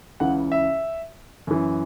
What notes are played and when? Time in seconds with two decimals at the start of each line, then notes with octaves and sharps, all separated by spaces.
0.20 C#2 C#3 E3 F#5
0.52 E5
1.47 F#2 E3